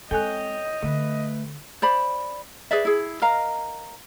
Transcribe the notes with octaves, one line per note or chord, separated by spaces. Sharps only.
G#3 C4 A4 C#5 D#5 G5 G#5 F#6
D3 A3 B4
C5 D5 B5
G#4 B4 D5 E5
E4 G#4
A#4 D#5 F5 A#5